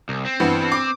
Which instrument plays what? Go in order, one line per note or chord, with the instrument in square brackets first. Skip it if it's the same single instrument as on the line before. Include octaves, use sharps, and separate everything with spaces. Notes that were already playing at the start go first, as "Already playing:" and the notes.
[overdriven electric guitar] C2
C4
[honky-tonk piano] G2 E3 B3
D6